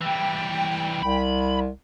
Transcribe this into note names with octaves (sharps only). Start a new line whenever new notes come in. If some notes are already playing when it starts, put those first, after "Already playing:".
E3 G3 G5
C2 B5